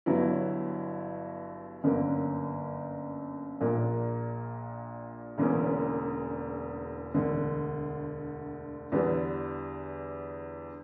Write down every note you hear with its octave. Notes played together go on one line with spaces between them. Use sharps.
G1 G2 F#3 B3 E4
G1 F#2 D3 A#3
A#1 A#2 A#3 D4
E1 E2 D3 A#3 C#4
E1 D2 D3
E2 D3 G3 B3